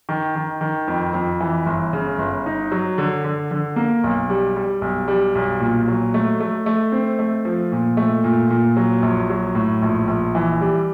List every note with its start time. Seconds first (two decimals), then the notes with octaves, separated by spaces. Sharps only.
0.09 D#3
0.35 D#3
0.61 D#3
0.88 F2
1.14 F2
1.41 E3
1.66 G1
1.93 C#3
2.18 G1
2.46 D#4
2.72 F#3
2.98 D3
3.24 D3
3.51 D3
3.76 A#3
4.04 B1
4.30 G3
4.56 G3
4.82 B1
5.08 G3
5.35 B1
5.60 A#2
5.88 F#3
6.14 A3
6.40 A3
6.66 A3
6.92 C4
7.19 A3
7.45 F3
7.72 A#2
7.97 A3
8.24 A#2
8.51 A#2
8.77 F#3
9.02 A#1
9.30 F#3
9.55 A2
9.82 A#1
10.08 A#1
10.35 E3
10.61 G3